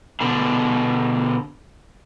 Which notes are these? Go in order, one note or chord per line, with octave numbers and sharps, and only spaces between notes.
B2 D3